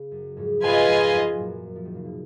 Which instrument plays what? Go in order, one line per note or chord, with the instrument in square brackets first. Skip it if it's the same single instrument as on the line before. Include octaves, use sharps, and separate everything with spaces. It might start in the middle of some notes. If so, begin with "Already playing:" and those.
Already playing: [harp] C#3
F#2
F2 G#2
[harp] G#2 B2 [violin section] F4 B4 D#5 G#5
[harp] F2 G#2
F#2
F#2 A#2
F3
D#3
C#3
B2